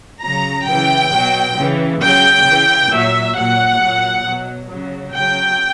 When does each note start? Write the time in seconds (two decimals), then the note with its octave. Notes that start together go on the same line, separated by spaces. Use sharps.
0.24 C#3 F#3 A#5
0.68 C#3 E3 G5
1.13 B2 F#3
1.58 C#3 E3
2.02 C#3 F#3 G5
2.47 C#3 E3
2.91 A#2 F#3 E5
3.36 A#2 F#3 F#5
3.81 A#2 F#3
4.25 B2 F#3
4.70 C#3 F#3
5.14 C#3 F#3 G5